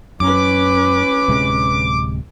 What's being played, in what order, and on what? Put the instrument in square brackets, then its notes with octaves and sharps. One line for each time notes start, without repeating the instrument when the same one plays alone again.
[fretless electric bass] F#2 [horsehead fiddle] C#4 B4 [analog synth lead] D6
[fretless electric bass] D1 C3 G#3